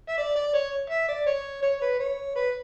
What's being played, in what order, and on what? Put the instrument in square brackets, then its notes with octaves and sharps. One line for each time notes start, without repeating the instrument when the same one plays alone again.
[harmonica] E5
D5
D5
C#5
E5
D5
C#5
C#5
B4
C#5
B4